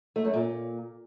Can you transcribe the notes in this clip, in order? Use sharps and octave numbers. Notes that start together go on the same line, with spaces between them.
A3
F#2
A#2